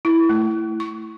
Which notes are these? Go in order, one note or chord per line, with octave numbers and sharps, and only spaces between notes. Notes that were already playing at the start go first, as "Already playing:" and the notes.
E4
A3
C#6